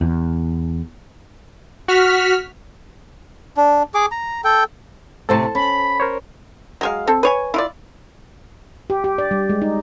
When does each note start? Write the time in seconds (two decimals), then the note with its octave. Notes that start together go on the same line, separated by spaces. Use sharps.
0.01 E2
1.88 F#4 F6 B6
3.57 D4
3.94 G#4 D6
4.12 A#5
4.44 A4 G5
5.29 A2 C3 C4 A4 C5 A5
5.55 C#4 B5
6.00 A#4 C5 C#5
6.81 F#3 G#3 F5
7.07 C4 A4
7.23 B4 C#5 G#5
7.54 E4 F4 D5
8.90 G4
9.04 G4
9.18 D5
9.31 G3
9.49 G#3
9.62 D#4